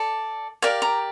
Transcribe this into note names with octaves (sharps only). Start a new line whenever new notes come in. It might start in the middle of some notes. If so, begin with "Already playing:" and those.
Already playing: A4 D5
G4 A#4 D5 F5
A#5